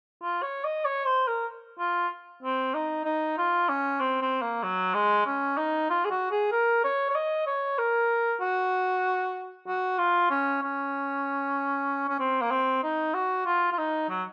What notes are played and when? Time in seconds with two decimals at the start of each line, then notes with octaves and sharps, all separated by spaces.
0.22 F4
0.42 C#5
0.64 D#5
0.85 C#5
1.05 C5
1.27 A#4
1.79 F4
2.43 C4
2.74 D#4
3.05 D#4
3.38 F4
3.69 C#4
4.00 C4
4.21 C4
4.42 A#3
4.63 F#3
4.94 G#3
5.26 C#4
5.57 D#4
5.90 F4
6.05 G#4
6.10 F#4
6.31 G#4
6.52 A#4
6.84 C#5
7.10 C#5
7.15 D#5
7.47 C#5
7.79 A#4
8.41 F#4
9.68 F#4
9.99 F4
10.30 C#4
10.63 C#4
12.09 C#4
12.19 C4
12.42 A#3
12.51 C4
12.83 D#4
13.14 F#4
13.46 F4
13.72 F4
13.78 D#4
14.09 F#3